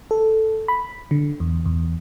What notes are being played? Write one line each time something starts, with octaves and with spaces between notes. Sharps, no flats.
A4
B5
D3
E2
E2